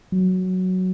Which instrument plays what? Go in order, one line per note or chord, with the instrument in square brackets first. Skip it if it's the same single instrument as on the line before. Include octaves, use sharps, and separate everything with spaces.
[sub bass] F#3